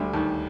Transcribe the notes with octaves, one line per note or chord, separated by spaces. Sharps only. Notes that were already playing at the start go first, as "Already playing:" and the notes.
Already playing: D2 D3 G3
D#2 D#3